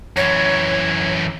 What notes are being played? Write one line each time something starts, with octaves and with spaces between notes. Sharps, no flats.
F#2 E3 C#5